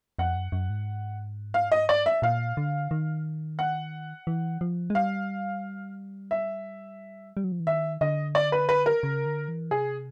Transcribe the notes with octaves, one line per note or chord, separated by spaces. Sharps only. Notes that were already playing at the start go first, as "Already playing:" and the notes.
F2 F#5
F#2
F#2
G#2
F5
D#5
D5
E5
A#2 F5
D3
D#3
F#5
E3
F3
G#3
G3 F5
E5
G3
F#3
F3
E3
D#3 E5
D3 D#5
D5
B4
B4
A#4
C#3
D3
E3
C3 G#4